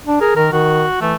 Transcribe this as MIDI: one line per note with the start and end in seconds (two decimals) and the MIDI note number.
0.07 0.20 62
0.21 0.35 68
0.21 0.34 70
0.37 0.48 51
0.37 0.47 70
0.52 0.85 51
0.52 0.99 66
1.01 1.15 52
1.01 1.15 57